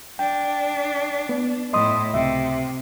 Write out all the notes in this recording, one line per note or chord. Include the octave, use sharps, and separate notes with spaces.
D4 G5
B3
A2 E4 D#5 C6 D#6
C#2 C3 E5